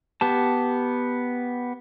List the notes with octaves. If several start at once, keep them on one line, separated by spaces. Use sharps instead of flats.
B3 G4 A5